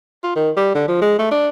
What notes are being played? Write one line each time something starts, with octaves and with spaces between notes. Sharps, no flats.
F4
D#3
G3
D3
F3
G#3
A3
D4